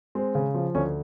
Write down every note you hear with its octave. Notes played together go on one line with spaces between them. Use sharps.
G#3 C4
C#3
F3
D2 C#4